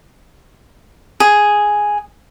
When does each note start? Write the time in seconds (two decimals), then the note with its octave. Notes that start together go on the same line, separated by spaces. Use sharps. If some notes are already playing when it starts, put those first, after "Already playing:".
1.20 G#4